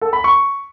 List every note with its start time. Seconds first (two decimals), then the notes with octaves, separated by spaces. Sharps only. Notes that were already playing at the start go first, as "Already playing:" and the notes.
0.01 A4
0.13 B5
0.24 C#6